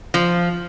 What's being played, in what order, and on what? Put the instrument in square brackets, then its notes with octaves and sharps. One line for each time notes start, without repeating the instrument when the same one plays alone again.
[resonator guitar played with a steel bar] F3